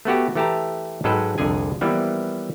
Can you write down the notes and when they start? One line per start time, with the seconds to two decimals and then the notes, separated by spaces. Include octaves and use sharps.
0.05 A3 B3 F#4 G4
0.35 E3 A3 G4 G5 A5 A#5
1.04 G#2 F#3 G#3 A4 B4 G5
1.38 C2 F2 D3 G#4 G#5
1.81 E3 F3 G3 A#3 B3 E4